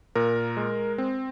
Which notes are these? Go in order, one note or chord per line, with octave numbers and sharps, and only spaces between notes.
A#2 A#4
G#3
C4